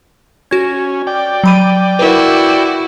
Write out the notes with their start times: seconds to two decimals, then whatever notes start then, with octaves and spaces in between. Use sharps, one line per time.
0.51 C#4 F#4 G#6
1.07 D5 G5
1.44 F#3 B5 D#7
1.99 E4 F#4 A#4 B4